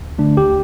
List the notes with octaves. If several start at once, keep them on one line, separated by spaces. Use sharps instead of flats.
D2
D3 A3 D4
D2 G4